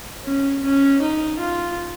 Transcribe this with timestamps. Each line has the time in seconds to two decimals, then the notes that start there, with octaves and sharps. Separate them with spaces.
0.25 C#4
0.63 C#4
1.01 D#4
1.39 F4